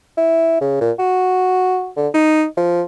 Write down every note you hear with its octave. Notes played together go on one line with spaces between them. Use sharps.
E4
C#3
A#2
F#4
D3
D#4
F3